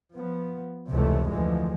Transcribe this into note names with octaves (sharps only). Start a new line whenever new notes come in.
F3 B3
F1 C#2 C3 E3 A3
D2 E3 F3 G#3